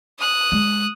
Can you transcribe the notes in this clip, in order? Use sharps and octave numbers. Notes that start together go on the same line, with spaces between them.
D#6 F#6
G#3